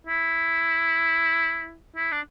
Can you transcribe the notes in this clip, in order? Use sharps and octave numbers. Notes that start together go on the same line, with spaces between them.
E4
E4
D4